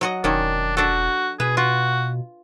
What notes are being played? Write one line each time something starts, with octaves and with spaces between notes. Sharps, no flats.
F#3 F#4 D#5
E1 D#3 C#4 D4
D4 F#4 A4
B2 G#4 B4
F4 F#4